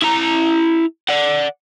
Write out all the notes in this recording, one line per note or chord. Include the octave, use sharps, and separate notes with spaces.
E4 A#5
D5 F#5